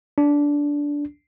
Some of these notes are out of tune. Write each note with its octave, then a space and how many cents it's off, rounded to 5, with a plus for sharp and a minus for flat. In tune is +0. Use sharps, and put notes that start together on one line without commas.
D4 -15